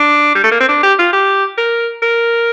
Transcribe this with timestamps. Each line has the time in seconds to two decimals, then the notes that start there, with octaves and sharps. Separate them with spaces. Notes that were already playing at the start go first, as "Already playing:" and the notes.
Already playing: D4
0.35 G3
0.44 A3
0.51 A#3
0.60 C4
0.69 D4
0.83 G4
0.99 F4
1.13 G4
1.58 A#4
2.02 A#4